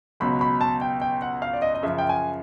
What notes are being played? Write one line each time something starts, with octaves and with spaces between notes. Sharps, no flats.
C#2 B2 F#3 B5
B5
A5
G5
G5
F#5
F5
D5
D#5
D#5
F#2 C#3 F3 E5
G5
G#5